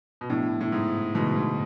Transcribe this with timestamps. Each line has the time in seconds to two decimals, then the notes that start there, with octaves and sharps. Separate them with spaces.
0.21 B2
0.30 A2 F3 B3 D4
0.61 A2
0.72 G#2
1.15 G#2 B2 D3 F3 A3
1.36 G#2